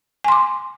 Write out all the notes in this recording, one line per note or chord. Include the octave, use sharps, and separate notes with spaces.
G#5 C6 D6